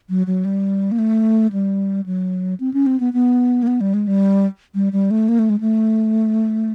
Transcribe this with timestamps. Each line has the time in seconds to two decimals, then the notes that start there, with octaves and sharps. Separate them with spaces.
0.09 F#3
0.27 F#3
0.45 G3
0.92 A#3
0.99 A3
1.52 G3
2.06 F#3
2.60 C4
2.74 C#4
2.86 C4
3.00 B3
3.13 B3
3.63 A#3
3.67 B3
3.81 G3
3.94 G#3
4.07 G3
4.75 G3
4.93 G3
5.11 A3
5.29 A#3
5.39 A3
5.50 G#3
5.60 A3